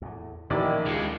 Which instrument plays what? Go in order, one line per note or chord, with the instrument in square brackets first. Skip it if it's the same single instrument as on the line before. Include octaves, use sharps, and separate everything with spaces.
[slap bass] E2 A2
[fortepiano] A1 E4 D5 [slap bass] A#2 F3 A#3 [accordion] D#3
[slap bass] D2 [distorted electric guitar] G#3 F4